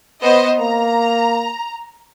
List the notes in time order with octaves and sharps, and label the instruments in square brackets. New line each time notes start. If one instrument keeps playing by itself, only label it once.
[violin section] B3 C5 D#5
[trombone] A#3 [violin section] A#5